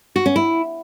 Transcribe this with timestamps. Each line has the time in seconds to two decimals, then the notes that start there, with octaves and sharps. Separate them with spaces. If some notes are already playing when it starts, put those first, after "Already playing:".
0.16 F#4
0.26 C#4
0.36 E4